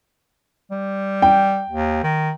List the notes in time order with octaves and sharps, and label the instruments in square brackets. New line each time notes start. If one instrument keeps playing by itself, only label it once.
[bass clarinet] G3
[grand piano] G5
[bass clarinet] D#2
D#3